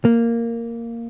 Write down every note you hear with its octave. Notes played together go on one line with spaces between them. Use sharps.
A#3